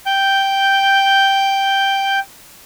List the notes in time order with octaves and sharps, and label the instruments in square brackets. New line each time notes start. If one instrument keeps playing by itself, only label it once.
[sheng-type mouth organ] G5 G6